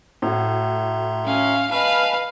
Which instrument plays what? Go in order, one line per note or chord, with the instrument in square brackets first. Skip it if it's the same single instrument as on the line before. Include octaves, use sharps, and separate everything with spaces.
[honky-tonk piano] A2 F#4 [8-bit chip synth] E5 A#5 C6
[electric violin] C#4 F5
[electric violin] B4 F5 [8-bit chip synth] D#5 G#5 A5 [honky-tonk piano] F6